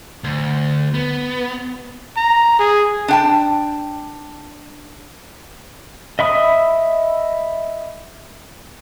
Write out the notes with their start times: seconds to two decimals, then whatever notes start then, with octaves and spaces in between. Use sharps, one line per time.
0.24 D2
0.94 B3
2.17 A#5
2.59 G#4
3.08 D4 G5 A5
6.19 D#5 E5 B5 D#6